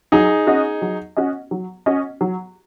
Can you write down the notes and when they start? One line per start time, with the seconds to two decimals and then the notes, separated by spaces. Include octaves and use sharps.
0.12 F#3 D#4 G#4
0.47 C#4 F#4 D#5
0.82 F#3
1.17 C#4 F#4 D#5
1.51 F#3
1.86 C#4 F#4 D#5
2.21 F#3